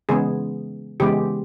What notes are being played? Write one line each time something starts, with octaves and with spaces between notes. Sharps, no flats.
C#3 E3 G#3 B3 G#4
C#3 E3 G#3 B3 G4